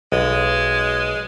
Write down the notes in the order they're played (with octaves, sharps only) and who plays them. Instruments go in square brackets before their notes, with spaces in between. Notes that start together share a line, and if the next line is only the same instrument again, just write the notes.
[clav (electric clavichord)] B1 [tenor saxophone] G#3